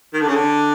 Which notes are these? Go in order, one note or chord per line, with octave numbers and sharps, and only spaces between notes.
D#3
D3
C#3
D3